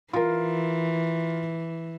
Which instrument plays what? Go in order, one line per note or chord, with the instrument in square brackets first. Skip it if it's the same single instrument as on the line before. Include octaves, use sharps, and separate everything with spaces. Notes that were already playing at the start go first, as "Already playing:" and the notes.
[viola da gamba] E3 [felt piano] F4 A#4